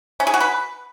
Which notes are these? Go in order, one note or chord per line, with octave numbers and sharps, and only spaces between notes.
C#4
G#4
F#4
B4